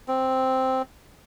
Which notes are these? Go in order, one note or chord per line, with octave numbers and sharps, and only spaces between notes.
C4